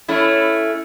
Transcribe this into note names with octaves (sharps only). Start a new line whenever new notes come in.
A3 C#4 E4